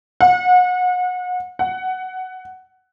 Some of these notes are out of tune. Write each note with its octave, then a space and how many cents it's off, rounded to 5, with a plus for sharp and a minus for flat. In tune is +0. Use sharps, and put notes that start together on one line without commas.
F#5 -30
F#5 +15